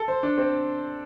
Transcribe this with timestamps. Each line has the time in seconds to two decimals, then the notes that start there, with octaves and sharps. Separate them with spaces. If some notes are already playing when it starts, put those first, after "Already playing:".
Already playing: A4
0.08 C5
0.23 D4
0.38 C4